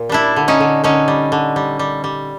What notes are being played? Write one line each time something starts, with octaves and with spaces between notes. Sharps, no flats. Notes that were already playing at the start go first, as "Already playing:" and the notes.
Already playing: A#2
G3 D4 E4
D3
C#4 D#4
D3
D3 C#4 D#4
G3
D3
G3
G3
G3